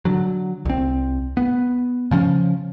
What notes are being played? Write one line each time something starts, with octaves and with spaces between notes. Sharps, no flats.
D3 F#3
C2 C4
B3
C#3 F3 C4 C#4